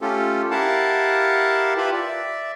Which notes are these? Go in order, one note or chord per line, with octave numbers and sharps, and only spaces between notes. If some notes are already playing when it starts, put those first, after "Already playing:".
A3 C#4 F4 G4 A4
E4 G4 A#4 F5 F#5 A5
F4 G4 B4 E5 B5
D5 E5